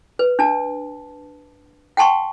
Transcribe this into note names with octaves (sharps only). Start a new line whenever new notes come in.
B4
D4 A5
F#5 G5 A5 C6 C#6